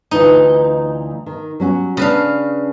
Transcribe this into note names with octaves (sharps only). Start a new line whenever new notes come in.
D2 E3 D#4 F4
D#3
F#3 C#4 F#4
C#3 C#4 D4 B4 F5